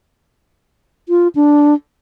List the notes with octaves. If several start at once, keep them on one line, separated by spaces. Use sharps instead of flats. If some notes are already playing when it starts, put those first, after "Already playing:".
F4
D4